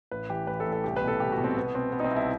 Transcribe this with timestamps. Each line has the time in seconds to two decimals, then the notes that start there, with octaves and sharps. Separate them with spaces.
0.11 A1 B4
0.30 E3 G4
0.47 A1 B4
0.60 A4
0.66 A1
0.72 A4
0.84 C2 G4
0.96 B4
1.02 B2
1.08 A4
1.20 C2 G4
1.32 F#4
1.38 B2
1.44 C4
1.57 B2 B3
1.75 B2 C4
1.92 B2 B3
2.00 D#4
2.04 C4
2.11 C2
2.16 E4